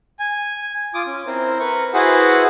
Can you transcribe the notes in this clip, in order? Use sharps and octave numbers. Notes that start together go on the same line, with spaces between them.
G#5
F4 D6 D#6
C#4
C4 E4 A#4 C5
A#4 B4 C#6
E4 F#4 G#4 B4 C5 F#5